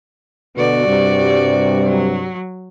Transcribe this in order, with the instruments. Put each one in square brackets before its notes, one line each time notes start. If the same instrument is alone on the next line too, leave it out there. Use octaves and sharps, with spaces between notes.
[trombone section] B2 D3 B3 [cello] F#4 D5
[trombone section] G2 C3 G3
[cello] F#3